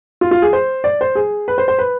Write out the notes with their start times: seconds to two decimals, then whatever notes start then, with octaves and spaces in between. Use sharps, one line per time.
0.21 F4
0.31 F4
0.42 G#4
0.53 C5
0.84 D5
1.01 C5
1.15 G#4
1.48 B4
1.58 C5
1.68 C5
1.79 B4